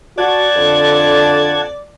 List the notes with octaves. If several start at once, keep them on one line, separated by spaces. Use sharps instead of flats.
F#4 D5 F#5 A5 G#6
F2 D3